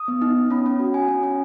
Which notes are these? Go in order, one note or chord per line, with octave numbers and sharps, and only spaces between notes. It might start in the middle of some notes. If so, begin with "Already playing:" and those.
Already playing: D#6
B3
D#4
B3
C#4 B5
C#4
F#4
F#4 G#5
C#4
C#4